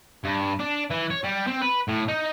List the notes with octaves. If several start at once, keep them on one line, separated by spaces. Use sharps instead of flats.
G2
D4
E3
C#5
G3
C4
B4
A2
D#4